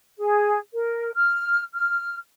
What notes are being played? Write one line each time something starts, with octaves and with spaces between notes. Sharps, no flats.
G#4
A#4
F6
F6